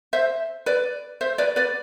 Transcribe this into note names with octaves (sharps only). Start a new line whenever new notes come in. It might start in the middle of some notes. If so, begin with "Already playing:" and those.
C5 E5
B4 D5
C5 E5
B4 D5
B4 D5